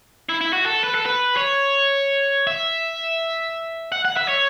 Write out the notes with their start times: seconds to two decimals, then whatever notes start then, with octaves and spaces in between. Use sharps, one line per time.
0.29 E4
0.41 E4
0.53 F#4
0.66 A4
0.84 B4
0.95 A4
1.06 B4
1.37 C#5
2.47 E5
3.92 F#5
4.05 F#5
4.17 E5
4.29 C#5